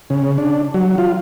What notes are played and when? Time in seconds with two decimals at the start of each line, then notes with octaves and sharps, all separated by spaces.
0.10 C#3
0.38 D4
0.74 F#3
0.98 F4